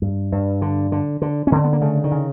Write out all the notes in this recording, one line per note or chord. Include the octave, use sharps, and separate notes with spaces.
G2
G2
D3
D3
D3
C#4
D3 C4
B3
A#3
C#3 A3
D#3
C#3